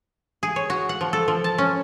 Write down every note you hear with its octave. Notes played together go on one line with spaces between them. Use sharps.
G#4
C#5
F#4
F#5
F3
A4
F3
A5
C#4